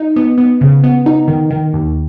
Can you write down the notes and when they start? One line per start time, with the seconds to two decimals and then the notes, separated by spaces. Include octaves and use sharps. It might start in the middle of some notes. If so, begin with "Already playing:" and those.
Already playing: D#4
0.16 B3
0.38 B3
0.61 C#3
0.84 B3
1.06 D#4
1.28 D#3
1.50 D#3
1.73 D#2